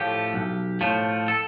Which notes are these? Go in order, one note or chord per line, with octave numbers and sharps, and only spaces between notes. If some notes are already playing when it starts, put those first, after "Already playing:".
Already playing: A2 F3 A3 G4
B1
A2 F3 A3
A4